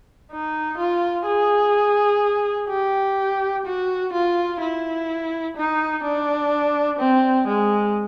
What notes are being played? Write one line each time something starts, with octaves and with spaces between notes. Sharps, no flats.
D#4
F4
G#4
G4
F#4
F4
E4
D#4
D4
C4
G#3